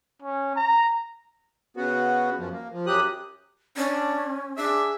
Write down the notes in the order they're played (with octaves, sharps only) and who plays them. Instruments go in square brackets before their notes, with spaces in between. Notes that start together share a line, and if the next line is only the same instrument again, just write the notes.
[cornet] C#4
A#5
[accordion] C#3 B3 F#4
F#2 F3
A#3
F3
F#2 F#3 G4 D#6 F#6
[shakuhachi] C#4 [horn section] D4
[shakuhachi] D4 [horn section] G#4 E5